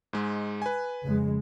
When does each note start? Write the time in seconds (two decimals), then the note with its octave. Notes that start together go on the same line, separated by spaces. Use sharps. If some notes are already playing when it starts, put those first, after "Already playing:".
0.13 G#2 G#3
0.62 B4 G#5
1.05 F2 C#3 G#3